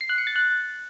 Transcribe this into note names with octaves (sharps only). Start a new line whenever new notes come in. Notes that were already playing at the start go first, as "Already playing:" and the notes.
C7
F#6
C#7
A6
F#6